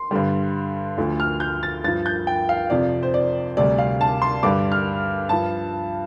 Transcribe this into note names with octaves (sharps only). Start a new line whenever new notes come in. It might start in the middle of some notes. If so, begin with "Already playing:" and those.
Already playing: C6
G2 D3 G3
D2 D3 F3
F6
G6
A6
G2 F3 A6
G6
G5
F5
F2 C3 F3 D5
C5
D5
D2 C3 G3 D5
F5
A5
C6
G2 D3 G3 D6
F6
G2 F3 A5